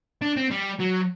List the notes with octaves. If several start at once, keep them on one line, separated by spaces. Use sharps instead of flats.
D4
C4
G3
F#3